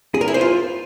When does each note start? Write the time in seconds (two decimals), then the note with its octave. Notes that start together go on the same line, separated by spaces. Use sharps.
0.14 G#4
0.21 A#4
0.28 E4
0.34 C5
0.41 F4